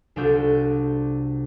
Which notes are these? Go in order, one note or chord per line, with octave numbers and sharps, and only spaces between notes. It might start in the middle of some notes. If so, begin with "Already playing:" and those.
C2 D4 F4 F#4 A4 G6